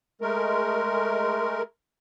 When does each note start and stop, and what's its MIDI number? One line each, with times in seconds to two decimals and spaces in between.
0.21 1.62 56
0.21 1.62 57
0.21 1.62 70